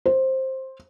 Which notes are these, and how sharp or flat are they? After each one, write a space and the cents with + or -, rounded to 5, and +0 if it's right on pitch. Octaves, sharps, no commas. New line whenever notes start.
C5 +10